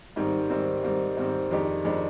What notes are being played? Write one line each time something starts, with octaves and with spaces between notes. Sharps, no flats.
G#2 D#3 G3 C4
G#2 D#3 G3 C4
G#2 D#3 G3 C4
G#2 D#3 G3 C4
F2 D#3 G#3 D4 G4
F2 D#3 G#3 D4 G4